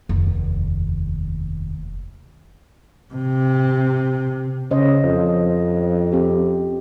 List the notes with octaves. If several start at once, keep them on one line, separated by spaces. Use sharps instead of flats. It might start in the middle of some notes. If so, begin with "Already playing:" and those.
F1 D#2
C3
C#3 C#4 C5 D#5
F2
C4 G4